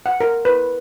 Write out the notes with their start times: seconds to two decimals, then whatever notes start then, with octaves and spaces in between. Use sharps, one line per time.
0.06 F#5
0.21 A#4
0.45 B4